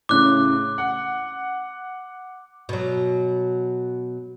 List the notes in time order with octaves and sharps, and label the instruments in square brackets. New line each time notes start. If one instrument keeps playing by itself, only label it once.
[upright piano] A2 C#3 [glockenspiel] D6 F#6
[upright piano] F#5
[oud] B2 F#3